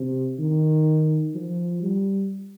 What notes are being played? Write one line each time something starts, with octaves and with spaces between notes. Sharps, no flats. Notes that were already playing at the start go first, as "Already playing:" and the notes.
Already playing: C3
D#3
F3
G3